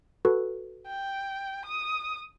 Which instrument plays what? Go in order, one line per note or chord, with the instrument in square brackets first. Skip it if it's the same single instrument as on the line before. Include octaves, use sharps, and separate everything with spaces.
[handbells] F#4 A4 B4
[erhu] G5
D#6